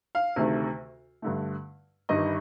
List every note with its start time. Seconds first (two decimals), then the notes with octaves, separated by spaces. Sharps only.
0.15 F5
0.36 D2 C3 D#3 A3
1.22 G2 D3 A3
2.09 G1 G2 D#3 G3 D#5